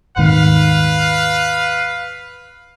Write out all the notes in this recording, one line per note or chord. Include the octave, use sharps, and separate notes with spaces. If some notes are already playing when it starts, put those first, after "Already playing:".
D#1 G#2 D#3 B4 F5